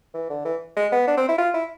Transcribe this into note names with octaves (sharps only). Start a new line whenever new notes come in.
E3
D3
E3
G#3
B3
D4
C4
E4
F4
E4